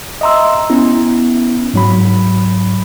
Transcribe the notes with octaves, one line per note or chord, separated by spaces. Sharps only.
D#5 E5 A#5 C6 E6
B3 C#4 E4
G#2 F#3 B5